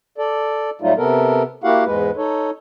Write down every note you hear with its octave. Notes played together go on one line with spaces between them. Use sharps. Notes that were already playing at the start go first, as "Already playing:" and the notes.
A4 D5
A2 F#3 G3 A3 D#4 F4
C3 B3 A4 A#4
A#3 E4 F#4 G4 F5 F#5
E2 G#2 G#3 B4
D#4 A4 C#5